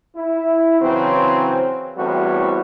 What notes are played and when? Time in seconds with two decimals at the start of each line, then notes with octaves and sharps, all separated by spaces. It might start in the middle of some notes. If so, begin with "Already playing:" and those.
0.15 E4
0.80 C#3 E3 F#3 C4
1.98 A1 E2 A2 G3 C4 F#4